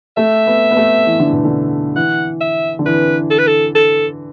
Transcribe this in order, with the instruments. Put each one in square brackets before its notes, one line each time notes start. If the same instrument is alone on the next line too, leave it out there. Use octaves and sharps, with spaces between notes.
[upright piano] A3 [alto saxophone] E5
[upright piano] B3
B3
A3
E3
D3
B2
D3
[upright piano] E3 [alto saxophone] F#5
[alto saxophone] E5
[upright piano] D3
[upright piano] E3 [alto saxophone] B4
[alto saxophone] A4
B4
A4
A4